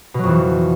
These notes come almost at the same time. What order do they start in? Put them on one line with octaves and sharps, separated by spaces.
B2 F#3 F2 E3